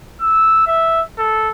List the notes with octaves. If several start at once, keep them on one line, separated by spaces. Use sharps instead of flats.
E6
E5
A4